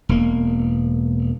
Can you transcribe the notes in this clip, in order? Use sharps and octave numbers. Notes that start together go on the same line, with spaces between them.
E1 A#3